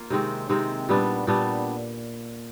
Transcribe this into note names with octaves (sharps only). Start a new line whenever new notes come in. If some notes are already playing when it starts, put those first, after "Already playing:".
Already playing: A#3 F4
C3 D#3 G#3 C4
C3 D#3 G#3 C4
A#2 G3 B3 D4
A#2 G3 B3 D4